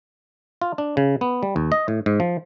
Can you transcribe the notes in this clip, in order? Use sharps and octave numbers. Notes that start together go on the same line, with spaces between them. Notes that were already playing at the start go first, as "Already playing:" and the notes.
F4
D4
C#3
B3
G3
D#2
D#5
A2
G#2
F3